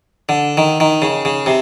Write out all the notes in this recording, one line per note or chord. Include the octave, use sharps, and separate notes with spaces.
D3
D#3
D#3
C#3
C#3
C3